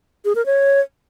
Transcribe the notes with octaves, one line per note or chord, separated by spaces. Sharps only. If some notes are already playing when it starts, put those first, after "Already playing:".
G#4
A#4
C#5